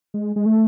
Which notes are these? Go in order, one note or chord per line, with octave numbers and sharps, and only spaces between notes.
G#3
G#3
A3